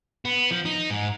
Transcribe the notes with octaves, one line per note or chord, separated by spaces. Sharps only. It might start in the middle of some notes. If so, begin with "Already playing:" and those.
B3
F3
D#4
G#2